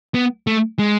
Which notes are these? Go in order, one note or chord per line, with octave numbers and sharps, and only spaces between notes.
B3
A3
G#3